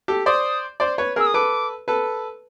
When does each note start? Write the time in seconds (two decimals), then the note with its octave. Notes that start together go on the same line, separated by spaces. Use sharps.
0.08 G4 A4
0.26 C5 D5 D#6
0.80 C5 D5
0.98 B4 C#5
1.16 G#4 A#4 E6
1.27 D#6
1.34 A4 B4 D6
1.88 A4 B4